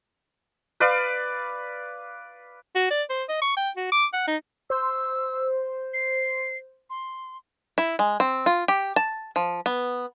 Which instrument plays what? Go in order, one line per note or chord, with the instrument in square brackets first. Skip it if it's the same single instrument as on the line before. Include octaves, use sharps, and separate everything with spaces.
[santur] B4 D5 F5
[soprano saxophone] F#4
D5
C5
D#5
C#6
G5
F#4
D6
F#5
D#4
[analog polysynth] C5 [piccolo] E6
[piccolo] C7
C6
[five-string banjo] E4
G#3
C4
F4
G4
A5
F3
B3